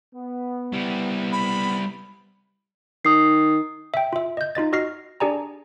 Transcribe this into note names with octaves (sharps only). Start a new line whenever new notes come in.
B3
G3 E4
B5
D#3 D#6 C7
E5 G5
F4 E5
D#5 G6
D#4 F4 D#5 A6
F#4 D#5 F6 A#6 C7
D4 G4 G#4 D5 G#5 A#5